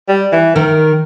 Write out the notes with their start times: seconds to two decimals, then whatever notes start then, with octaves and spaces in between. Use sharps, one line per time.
0.09 G3
0.32 E3
0.56 D#3 A#4